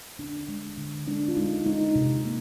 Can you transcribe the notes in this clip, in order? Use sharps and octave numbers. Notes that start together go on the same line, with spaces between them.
D3 D4
G#3
D3
G#3 D4
F4
G#3 D#4
G#3 D#4
C3
A#3